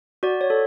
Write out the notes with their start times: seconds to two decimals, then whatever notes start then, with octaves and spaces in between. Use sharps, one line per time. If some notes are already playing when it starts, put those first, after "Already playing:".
0.23 F#4 D5
0.41 C#5
0.50 A4